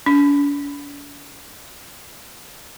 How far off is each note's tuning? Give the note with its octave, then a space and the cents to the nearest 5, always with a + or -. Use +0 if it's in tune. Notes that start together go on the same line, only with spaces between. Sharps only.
D4 -45